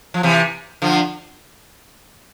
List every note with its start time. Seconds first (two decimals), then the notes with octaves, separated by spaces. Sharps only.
0.14 F3
0.23 C3 E3
0.82 D3 F3